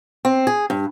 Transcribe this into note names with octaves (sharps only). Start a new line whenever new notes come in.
C4
G#4
G2